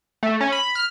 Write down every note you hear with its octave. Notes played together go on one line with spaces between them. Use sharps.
A3
C#4
B5
F6